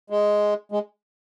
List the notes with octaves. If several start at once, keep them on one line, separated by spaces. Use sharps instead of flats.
G#3
G#3